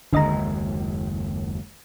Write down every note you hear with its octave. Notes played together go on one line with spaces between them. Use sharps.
F#1 D#2 D3 G#3 D#5 A#5